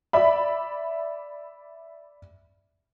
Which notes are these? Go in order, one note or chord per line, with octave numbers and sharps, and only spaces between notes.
D5 E5 B5